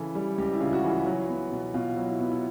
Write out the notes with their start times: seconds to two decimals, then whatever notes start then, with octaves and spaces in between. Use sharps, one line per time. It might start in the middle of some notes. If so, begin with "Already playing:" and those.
Already playing: C#3 E3 A4
0.15 G3
0.38 C#2 G4
0.53 E4
0.61 C#3 F4
0.73 F#4
0.84 E3
1.06 F#3
1.29 B3
1.52 B2
1.74 B2 F4
1.97 F#3
2.09 E4
2.20 B3
2.32 E4